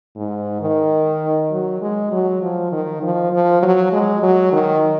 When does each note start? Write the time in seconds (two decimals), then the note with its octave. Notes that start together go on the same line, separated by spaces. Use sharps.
0.16 G#2
0.62 D#3
1.52 F#3
1.81 G#3
2.12 F#3
2.42 F3
2.72 D#3
3.02 F3
3.33 F3
3.63 F#3
3.93 G#3
4.23 F#3
4.53 D#3